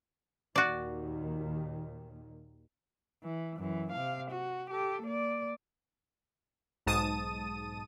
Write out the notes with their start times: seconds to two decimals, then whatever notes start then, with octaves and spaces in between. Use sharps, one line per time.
0.56 D#2 A#2 D#3 F#4 D5
3.23 E3
3.57 F#2 E3
3.93 C3 F5
4.31 F#4
4.71 G4 A4
5.03 A#3 D5
6.86 B1 G#2 A5 D#6 D#7